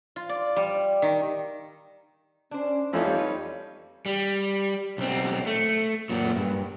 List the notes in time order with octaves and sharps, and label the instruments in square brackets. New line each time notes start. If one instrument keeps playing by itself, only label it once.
[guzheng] F4
D5
G3
D#3
[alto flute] C#4 [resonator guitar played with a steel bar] D4 C5
[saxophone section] F2 D#4 C#5 [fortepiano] E3 F3 A3 [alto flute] F5
[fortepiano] G3
[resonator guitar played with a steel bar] B4
[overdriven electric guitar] G3
B1 C4
A3
F#2 A#2
G2